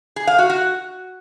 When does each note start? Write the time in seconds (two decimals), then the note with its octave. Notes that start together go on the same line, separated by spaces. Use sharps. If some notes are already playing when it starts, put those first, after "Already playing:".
0.16 G#4
0.27 F5
0.39 F#4
0.50 F#4